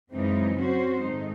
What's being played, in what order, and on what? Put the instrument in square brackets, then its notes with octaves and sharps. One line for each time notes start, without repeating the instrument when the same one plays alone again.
[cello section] F#2 C#3 E3 G#3 D#4 [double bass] C4
[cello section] F#3 C#4 F#4 C5 [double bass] C4
[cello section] G#2 D#3 G#3 D#4 [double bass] A3